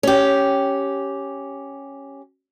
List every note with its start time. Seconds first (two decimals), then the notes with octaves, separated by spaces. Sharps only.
0.03 C#4 G4